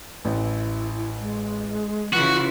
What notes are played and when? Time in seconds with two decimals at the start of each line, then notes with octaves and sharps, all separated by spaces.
0.25 A1 E4
1.19 G#3
2.13 C#3 E3 F4 F#4